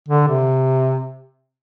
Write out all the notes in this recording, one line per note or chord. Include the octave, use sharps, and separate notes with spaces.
D3
C3